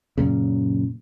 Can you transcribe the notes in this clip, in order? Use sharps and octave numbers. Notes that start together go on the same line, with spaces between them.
F#2 A#2 C#3